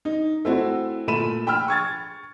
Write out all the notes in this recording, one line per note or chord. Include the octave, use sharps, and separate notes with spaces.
D#4
A3 C4 E4 F#4
A#2 A3 B5 D#7 E7
G5 B5 E6 F6
C#6 G#6 A6